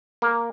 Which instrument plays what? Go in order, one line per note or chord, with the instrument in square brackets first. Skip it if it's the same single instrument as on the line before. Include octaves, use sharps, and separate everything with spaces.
[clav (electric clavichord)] A#3